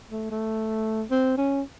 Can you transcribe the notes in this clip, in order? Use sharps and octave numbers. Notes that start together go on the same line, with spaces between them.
A3
A3
C4
C#4